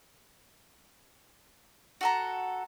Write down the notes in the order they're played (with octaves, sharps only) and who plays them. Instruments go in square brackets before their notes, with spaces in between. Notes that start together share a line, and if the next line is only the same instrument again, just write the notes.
[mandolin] F#4 A4 A#5